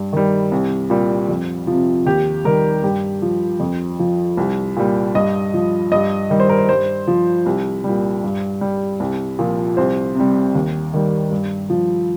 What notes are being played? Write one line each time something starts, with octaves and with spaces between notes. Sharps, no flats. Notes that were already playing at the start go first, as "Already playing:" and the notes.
Already playing: G2
D#3 G3
C2
A#2 G3
F2
C3 F3
D#2 G4
D#3 G3 A#4
G2 G4
F3
F2
F3
C2
A#2 G3
G2 D#5
F3
G2 D#5
D#3 G3 D#5
C5
A#4
C5
G2 C5
F3
C2
G3
A#2
G2
G3
C2
A#2 F3
C2 C5
C3 G3
D#2
D#3 G3
G2
F3